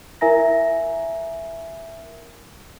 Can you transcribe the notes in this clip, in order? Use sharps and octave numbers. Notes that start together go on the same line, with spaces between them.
E4 A#4 E5 G#5 A#5 A#6